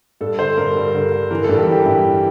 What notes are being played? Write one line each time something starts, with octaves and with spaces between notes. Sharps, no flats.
G2 A4
D3 C5
G2 A#4
G2
D3
D3
E3 A#4
A4
G2
G4
E3
G4
G2 E4
E3